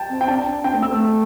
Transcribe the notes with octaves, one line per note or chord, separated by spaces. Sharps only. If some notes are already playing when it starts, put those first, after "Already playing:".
Already playing: G5 A5
C4
G5
D4 A5
C4 G5
A3
C4 E6
A3